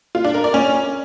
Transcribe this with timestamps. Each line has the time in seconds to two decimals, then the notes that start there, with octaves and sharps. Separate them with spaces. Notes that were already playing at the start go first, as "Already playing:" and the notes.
0.15 F4
0.25 D4
0.34 A#4
0.44 D5
0.54 C#4